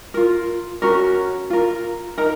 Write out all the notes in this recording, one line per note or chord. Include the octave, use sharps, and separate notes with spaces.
F4 A#4
C#4 F#4 A#4
F4 A#4
D#4 A#4 A#5